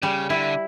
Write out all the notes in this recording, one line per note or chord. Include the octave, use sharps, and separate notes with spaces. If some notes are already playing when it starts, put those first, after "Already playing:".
C#3 G3
D3 E4